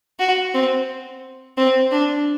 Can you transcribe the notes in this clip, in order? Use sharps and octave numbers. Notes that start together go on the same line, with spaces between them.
F#4
C4
C4
D4